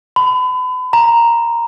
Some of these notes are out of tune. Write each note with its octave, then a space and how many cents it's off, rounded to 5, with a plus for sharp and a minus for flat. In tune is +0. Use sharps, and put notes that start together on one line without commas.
B5 +35
A#5 +0